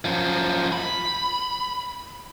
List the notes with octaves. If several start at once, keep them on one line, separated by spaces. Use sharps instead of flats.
F#2 F3
B5